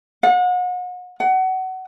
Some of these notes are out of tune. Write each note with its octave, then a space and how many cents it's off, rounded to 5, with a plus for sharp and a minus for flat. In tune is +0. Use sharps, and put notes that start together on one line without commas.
F#5 -40
F#5 +25